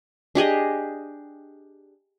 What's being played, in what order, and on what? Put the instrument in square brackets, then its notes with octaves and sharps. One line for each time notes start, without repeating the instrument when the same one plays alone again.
[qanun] D4 G4 G#4 D#5